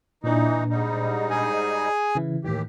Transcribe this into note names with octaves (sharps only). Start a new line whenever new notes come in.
A#2 E3 D4 D#4
G#2 G3 D#4
G#4 G#5
C#3 E3 E4
D#2 A2 D#3 E3 G4